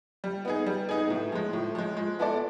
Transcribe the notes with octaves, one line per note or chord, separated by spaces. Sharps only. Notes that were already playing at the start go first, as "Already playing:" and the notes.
G3
B3 D#4 G#4
G3
B3 D#4 G#4
A2
F3 G#3
A2
F3 G#3
G#3
B3 E4 A4 D5